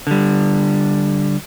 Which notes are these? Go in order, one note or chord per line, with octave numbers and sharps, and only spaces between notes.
D3 G3